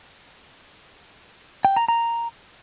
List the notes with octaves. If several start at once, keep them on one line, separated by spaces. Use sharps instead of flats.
G5
A#5
A#5